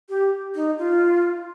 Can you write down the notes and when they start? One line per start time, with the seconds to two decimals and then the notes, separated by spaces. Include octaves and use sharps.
0.09 G4
0.55 D#4
0.78 F4